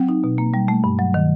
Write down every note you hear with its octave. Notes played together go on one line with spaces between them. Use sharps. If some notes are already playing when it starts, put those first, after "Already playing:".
Already playing: F#3 C4
D#4
B2
A#3
G3
A3
G2
F#3
D#3